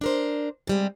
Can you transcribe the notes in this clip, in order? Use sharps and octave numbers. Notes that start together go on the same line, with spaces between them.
D4 A#4 C5
C3 G3 G#3